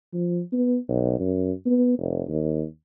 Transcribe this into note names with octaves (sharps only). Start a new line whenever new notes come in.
F3
B3
B1
F#2
B3
F1
D#2